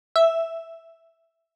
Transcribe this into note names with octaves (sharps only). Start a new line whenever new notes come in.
E5